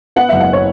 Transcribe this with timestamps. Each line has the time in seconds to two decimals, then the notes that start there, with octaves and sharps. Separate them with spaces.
0.16 B3 F#5
0.29 F#1 E5
0.40 F#5
0.53 C#5